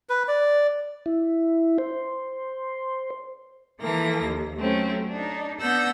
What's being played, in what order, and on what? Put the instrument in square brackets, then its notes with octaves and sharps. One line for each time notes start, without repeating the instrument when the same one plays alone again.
[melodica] B4
D5
[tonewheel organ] E4
C5
[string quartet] E3 F3 A#3 A4 A#6
D#2
F#3 A3 C4 C#4
D4 D#4
B3 D4 F#5 E6 G6 A#6